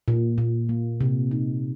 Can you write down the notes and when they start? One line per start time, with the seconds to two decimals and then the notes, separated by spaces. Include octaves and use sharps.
0.08 A#2
0.38 A#2
0.69 A#3
1.01 C3
1.31 D#4